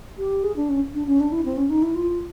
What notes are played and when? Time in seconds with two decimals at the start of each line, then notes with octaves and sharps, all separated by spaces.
0.18 G4
0.43 G#4
0.56 D4
0.69 C#4
0.94 D4
1.07 C#4
1.20 D4
1.32 E4
1.45 C4
1.57 C#4
1.70 D#4
1.82 E4
1.95 F4